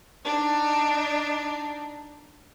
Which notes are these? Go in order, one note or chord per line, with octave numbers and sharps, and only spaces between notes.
D4 D#4